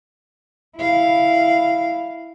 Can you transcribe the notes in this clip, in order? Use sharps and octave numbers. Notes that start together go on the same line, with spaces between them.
E4 F5